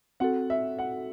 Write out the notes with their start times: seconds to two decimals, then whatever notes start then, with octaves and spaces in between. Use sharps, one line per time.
0.20 C4 F#4 A4 F#5
0.50 E5
0.79 F#5